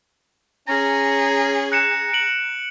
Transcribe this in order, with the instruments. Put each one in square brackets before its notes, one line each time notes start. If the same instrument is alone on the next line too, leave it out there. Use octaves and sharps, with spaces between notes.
[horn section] C#4 [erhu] G#4 [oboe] A#5
[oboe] A#5 [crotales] F#6 C#7 E7
[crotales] D7 F#7